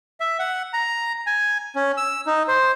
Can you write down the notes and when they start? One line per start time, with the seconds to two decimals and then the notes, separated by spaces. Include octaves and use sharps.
0.20 E5
0.39 F#5
0.73 A#5
1.27 G#5
1.76 C#4
1.97 E6
2.26 D#4
2.48 C5